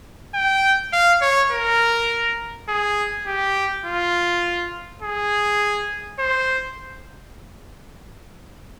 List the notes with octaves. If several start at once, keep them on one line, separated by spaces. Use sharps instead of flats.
G5
F5
C#5
A#4
G#4
G4
F4
G#4
C5